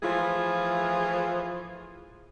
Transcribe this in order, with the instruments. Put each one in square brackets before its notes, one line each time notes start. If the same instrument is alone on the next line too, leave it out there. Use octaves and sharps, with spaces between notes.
[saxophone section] E3 F3 A3 F4 G#4